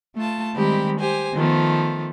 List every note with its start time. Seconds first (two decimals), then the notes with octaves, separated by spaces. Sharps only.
0.16 A3 F4 A5
0.55 D#3 G3 G#3 C4 G4 B5
1.00 G4 C5 G#5
1.34 D#3 F3 A3 B3